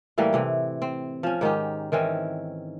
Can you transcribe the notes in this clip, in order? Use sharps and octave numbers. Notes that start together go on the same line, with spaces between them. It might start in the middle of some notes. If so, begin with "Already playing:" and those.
A2 E3 G3 A#3
A2 C3 E3
C4
F3 C#4
G#2 D#3 D#4 G4
D#3 E3 C4 C#4